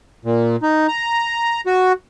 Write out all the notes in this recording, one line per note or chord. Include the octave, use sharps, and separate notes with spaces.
A#2
D#4
A#5
F#4